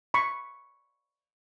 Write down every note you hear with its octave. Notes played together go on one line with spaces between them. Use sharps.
B5 C#6